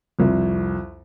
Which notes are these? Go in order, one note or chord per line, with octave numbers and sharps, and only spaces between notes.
C2 F2